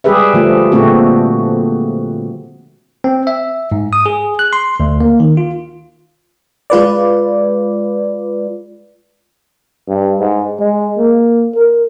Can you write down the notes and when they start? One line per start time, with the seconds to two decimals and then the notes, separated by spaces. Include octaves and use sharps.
0.04 G3 G#3 G4 G#4 B4 E5
0.33 D3 F3 A3
0.72 A#2 D3 A3 C4 F#4
3.04 C4
3.27 E5
3.72 G#2
3.93 D#6
4.06 G#4
4.39 F#6
4.53 C6
4.80 D2
5.01 A#3
5.20 D#3
5.37 F4
6.70 G#3 F4 B4 D5
9.88 G2
10.20 G#2
10.59 G#3
10.98 A#3
11.55 A#4